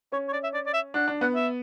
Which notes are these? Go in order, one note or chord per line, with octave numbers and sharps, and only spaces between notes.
C#4 C#5
C#5
D5
E5
D5
D5
E5
D4 F#5
D4
B3 F#5
E5